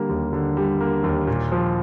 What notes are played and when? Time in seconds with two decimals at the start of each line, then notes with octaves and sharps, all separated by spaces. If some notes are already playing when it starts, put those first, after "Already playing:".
Already playing: D3 G3 A#3
0.09 D#2
0.33 D3
0.57 G3
0.81 A#3
1.04 D#2
1.27 A#2
1.52 F3